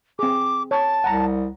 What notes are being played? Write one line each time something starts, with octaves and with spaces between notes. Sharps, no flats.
C4 G#4 D6
C#5 A5
C2 F#5 A#5